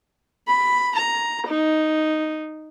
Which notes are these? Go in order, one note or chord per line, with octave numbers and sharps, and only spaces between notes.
B5
A#5
D#4